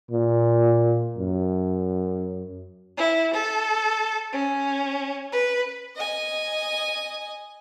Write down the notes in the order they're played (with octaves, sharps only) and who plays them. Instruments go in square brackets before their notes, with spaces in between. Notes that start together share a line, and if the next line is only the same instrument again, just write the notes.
[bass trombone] A#2
F#2
[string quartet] E4
A4
C#4
B4
[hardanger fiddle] D#5 G#5